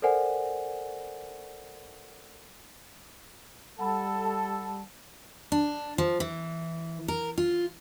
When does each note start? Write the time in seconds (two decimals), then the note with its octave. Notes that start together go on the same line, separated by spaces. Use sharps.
0.02 A4 A#4 C5 D5 F#5 G#5
3.79 G3 A4 F#5 A5 B5
5.52 D4
5.98 F3
6.20 E3
7.08 A#4
7.38 F4